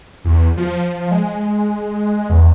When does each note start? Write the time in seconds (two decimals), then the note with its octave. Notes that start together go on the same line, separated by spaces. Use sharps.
0.25 E2
0.57 F3
1.11 G#3
2.30 E2